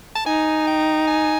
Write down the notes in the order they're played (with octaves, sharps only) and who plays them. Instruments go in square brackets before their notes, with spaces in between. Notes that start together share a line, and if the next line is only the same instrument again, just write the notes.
[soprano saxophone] A5
[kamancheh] D#4 [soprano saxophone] G#5
[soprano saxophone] G5
G#5